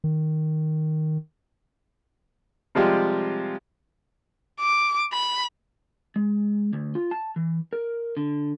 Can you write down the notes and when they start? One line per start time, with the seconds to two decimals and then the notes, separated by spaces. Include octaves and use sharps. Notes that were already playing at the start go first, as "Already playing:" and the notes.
0.04 D#3
2.75 C3 F3 G3 G#3 F4 G4
4.60 D6
5.13 B5
6.16 G#3
6.73 D2
6.95 F4
7.11 A5
7.36 E3
7.73 A#4
8.17 D3